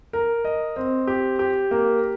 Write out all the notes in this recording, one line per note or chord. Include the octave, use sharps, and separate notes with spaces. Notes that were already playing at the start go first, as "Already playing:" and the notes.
A#4
D#5
C4
G4
G4
A#3